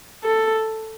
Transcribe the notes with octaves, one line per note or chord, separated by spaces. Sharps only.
A4